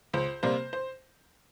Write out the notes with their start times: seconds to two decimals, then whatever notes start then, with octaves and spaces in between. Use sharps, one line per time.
0.13 C#2 C5
0.43 C3 G3 A#3 C5
0.73 C5